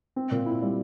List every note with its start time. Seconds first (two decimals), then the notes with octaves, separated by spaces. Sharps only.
0.16 C4
0.31 A#2
0.46 E4
0.62 G3